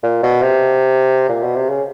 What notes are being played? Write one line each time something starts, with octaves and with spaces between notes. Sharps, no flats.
A#2
B2
C3
A#2
B2
C3
C#3